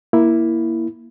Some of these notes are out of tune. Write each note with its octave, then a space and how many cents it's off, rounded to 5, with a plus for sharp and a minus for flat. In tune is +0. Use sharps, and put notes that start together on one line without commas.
A#3 +10 E4 +0